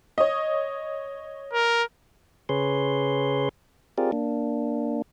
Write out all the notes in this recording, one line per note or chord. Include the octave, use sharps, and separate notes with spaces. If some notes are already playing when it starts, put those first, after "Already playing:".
C#5 D#5
A#4
C#3 G#4 B4 C#5 C6
C4 F4 G4 G#4 A#4 D5
A#3 D4